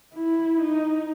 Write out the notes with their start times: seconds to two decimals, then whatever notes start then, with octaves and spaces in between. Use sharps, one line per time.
0.15 E4
0.61 D#4